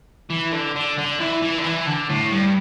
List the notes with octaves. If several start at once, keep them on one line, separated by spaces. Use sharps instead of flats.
E3
D3
D3
D3
E3
E3
D3
E3
D3
A2
G2